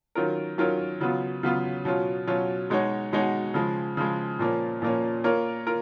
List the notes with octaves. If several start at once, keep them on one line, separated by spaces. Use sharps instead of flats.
D#3 F#3 C#4 F4 A#4
D#3 F#3 C#4 F4 A#4
C#3 F#3 B3 F4
C#3 F#3 B3 F4
B2 F#3 C#4 F4
B2 F#3 C#4 F4
B2 G#3 D#4 F#4 C#5
B2 G#3 D#4 F#4 C#5
C#3 F3 G#3
C#3 F3 G#3
A#2 F3 A#3 C#4
A#2 F3 A#3 C#4
A#3 F4 A#4 C#5
F4 A#4